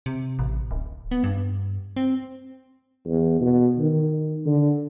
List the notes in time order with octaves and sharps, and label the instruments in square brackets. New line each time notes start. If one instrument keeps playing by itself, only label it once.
[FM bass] C3
A1
D1
B3
G2
C4
[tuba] E2
B2
D#3
D3